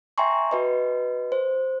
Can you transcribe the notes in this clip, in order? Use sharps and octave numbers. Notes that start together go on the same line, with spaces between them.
E5 G5 G#5 A#5 C6 C#6
F#4 B4 D#5
C5